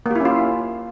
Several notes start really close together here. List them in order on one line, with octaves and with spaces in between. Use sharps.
A#3 G4 E4 C#4 F4